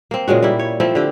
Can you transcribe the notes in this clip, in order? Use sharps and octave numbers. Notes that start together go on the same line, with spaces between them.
A#3 C4
A#2 C#3 G#3 F#4
G3 A#3 E4
C#5
F3 A3 C4 E4
D3 G4